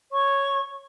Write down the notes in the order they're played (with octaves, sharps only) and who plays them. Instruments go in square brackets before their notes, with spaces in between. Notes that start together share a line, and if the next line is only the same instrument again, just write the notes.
[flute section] C#5 C#6